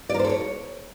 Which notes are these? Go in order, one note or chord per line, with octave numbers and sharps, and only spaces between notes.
D5
A#4
C5
A4
C#5